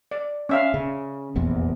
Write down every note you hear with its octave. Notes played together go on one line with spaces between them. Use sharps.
D5
C#4 E5 F5
C#3
F1 A#1 E2